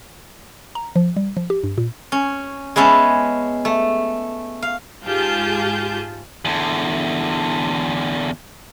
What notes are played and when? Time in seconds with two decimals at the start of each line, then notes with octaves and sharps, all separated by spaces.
0.75 A#5
0.96 F3
1.16 G3
1.37 F3
1.50 G4
1.64 G2
1.78 A#2
2.12 C#4
2.76 G#3 B3 C#4 E5 A5
3.65 A3
4.62 F5
5.05 G#2 F4 G4 G#4 A5 G6
6.45 E2 D3